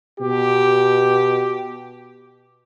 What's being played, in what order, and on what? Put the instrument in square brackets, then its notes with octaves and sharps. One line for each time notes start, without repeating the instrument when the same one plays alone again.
[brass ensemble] B2 G4